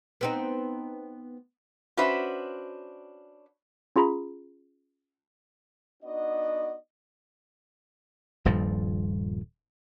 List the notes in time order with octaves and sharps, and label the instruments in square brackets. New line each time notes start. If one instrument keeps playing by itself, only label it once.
[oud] B3 C4 D#4
[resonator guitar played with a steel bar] C#4 D4 F#4 B4 C5 E5
[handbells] C#4 F4 G#4 A#5 B5
[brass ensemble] B3 D4 D#4 F#4 D5 D#5
[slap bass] D#1 G2 A#2 F3